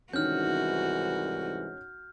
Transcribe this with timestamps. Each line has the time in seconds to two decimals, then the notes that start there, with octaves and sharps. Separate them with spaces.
0.13 C2 G#2 D#3 E3 C#4 F#4 F6 G6